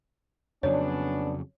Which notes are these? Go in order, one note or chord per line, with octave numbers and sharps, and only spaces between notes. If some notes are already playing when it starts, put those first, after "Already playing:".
F2 C#3 F#3 B3 C#4 D4 C#5